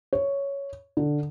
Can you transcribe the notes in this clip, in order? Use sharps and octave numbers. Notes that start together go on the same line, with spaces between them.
C#5
D3